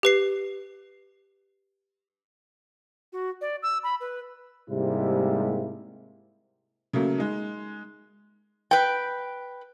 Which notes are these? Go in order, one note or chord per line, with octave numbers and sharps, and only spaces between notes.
G4 B4 C7
F#4
D5
E6
B5
B4
G#2 C3 G3 G#3 A#3 E4
C#3 F#3 A3 A#3
G#3 D#4
B4 G5